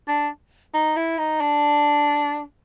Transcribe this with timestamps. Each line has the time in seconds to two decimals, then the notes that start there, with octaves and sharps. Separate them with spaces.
0.08 D4
0.74 D#4
0.96 E4
1.18 D#4
1.41 D4